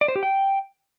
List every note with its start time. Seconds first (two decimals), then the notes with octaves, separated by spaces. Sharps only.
0.01 D5
0.08 C5
0.16 G4
0.23 G5